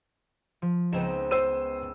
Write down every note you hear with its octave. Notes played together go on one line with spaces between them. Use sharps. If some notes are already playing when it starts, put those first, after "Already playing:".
F3
C#2 B3 C4 D#4 G5 E7
C5 E6 D#7